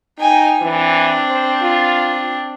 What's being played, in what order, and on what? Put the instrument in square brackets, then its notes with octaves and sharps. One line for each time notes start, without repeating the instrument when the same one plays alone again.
[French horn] D#4 [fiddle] G5 G#5
[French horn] E3 [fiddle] C4 D4
[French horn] C5
F4